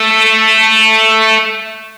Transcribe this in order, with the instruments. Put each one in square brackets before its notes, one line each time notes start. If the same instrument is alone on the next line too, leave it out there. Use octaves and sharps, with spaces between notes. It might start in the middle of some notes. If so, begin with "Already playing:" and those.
Already playing: [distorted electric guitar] A3